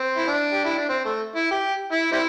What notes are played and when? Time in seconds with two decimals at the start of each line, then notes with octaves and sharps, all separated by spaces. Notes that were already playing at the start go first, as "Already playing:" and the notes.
Already playing: C4
0.17 E4
0.27 D4
0.53 G4
0.65 E4
0.77 D4
0.89 C4
1.05 A3
1.36 E4
1.51 G4
1.92 E4
2.12 G3 C4 E4